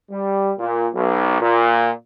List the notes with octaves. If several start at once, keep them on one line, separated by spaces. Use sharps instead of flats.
G3
A#2
B1
A#2